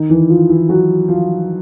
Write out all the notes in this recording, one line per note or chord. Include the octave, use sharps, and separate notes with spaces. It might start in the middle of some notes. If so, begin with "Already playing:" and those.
Already playing: D#3 D#4
E3 E4
F3 F4
E3 E4
F#3 F#4
F3 F4